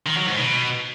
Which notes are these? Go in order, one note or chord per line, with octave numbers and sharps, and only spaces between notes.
D#3
F#3
G#2
B2